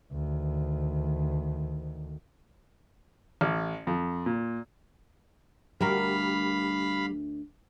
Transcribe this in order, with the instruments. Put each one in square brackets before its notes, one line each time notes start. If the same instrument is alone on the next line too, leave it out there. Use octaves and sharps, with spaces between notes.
[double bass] D2 D#3
[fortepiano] A1
F2
A#2
[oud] D2 F#4 A#4 [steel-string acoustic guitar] G3 [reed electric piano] G4 [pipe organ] F5 B5